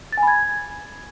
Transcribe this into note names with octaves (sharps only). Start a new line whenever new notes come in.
A6
G#5
B5
G#6